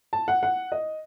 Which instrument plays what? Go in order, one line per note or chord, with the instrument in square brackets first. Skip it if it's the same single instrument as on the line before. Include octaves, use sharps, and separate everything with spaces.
[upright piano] A5
F#5
F#5
D#5